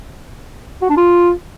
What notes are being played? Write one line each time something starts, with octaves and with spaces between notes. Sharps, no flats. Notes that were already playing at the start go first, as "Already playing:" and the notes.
F#4
D4
F4